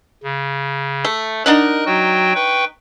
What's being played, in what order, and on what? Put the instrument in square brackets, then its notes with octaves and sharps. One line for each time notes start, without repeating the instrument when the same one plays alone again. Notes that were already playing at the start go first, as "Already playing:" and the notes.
[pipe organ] C#3
[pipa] A3
[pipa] D4 D#4 F#5 [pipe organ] A#4 F#6
[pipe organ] F#3 F#4 G5
B4 G5 C#6